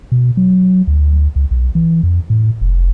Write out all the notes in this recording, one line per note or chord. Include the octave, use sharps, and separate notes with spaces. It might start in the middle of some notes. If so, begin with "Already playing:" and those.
B2
F#3
D2
C#2
B1
E3
F2
A2
F1